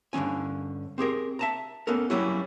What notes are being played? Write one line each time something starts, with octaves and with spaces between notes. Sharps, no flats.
G2 D3 E3 C#4 G#5
C4 G4 G#4 A#4
E5 A5 A#5
B3 C#4 A4 A#4
F#3 G3 A#3 C#4 E4 F#4